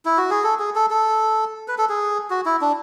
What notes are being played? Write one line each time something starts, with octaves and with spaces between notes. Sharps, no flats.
E4
F#4
G#4
A4
G#4
A4
A4
B4
A4
G#4
F#4
E4
D4